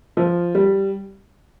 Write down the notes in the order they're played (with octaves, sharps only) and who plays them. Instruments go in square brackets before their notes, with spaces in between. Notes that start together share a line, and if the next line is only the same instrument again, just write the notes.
[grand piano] F3
G3